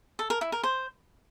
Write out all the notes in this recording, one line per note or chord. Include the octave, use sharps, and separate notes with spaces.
A4
A#4
E4
A#4
C5